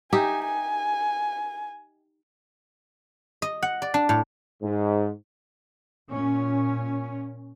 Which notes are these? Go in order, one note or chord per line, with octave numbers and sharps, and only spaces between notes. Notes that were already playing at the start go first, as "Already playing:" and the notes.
D#4 G4 E5 G#5
G#5
D#5
F#5
D5
D4
A2
G#2
A#2 C#4